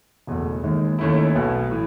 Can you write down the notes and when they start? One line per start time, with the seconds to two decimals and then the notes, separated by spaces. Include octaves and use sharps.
0.27 F#1 E2 B2 A3
0.63 D#2 D#3 G#3
0.99 D#2 D#3 A3 C#4 E4
1.35 B1 B2 A3
1.71 A2 E3